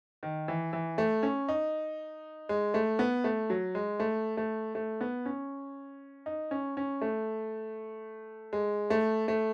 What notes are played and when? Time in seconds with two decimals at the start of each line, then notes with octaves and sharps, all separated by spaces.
0.23 D#3
0.48 E3
0.73 E3
0.98 A3
1.23 C#4
1.48 D#4
2.49 G#3
2.74 A3
2.99 B3
3.24 A3
3.50 F#3
3.75 G#3
4.00 A3
4.37 A3
4.75 A3
5.01 B3
5.26 C#4
6.26 D#4
6.51 C#4
6.77 C#4
7.02 A3
8.53 G#3
8.90 A3
9.28 A3